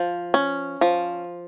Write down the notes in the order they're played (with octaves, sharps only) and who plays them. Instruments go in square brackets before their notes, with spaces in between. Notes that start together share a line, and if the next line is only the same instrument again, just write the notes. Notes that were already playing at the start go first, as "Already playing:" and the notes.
Already playing: [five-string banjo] F3
C#4
F3